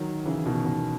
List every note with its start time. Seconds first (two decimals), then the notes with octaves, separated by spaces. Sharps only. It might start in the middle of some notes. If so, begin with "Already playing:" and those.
Already playing: D#3 F#3
0.25 C#3 E3
0.46 B2 D#3
0.65 B2